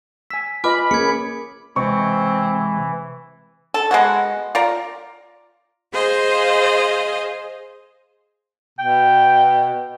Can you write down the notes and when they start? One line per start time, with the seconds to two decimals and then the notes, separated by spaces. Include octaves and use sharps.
0.30 G#5 E6 B6
0.64 F4 B4 D#5 G#5 B5 D6 F6
0.91 A#3 C#4 G#4 G#6 C#7
1.76 C3 E3 G#3 C4 C#6
3.74 A4
3.91 G#3 B3 F#4
4.55 F4 D5 A#5
5.93 G#4 C5 D#5 F5
8.79 B2 G5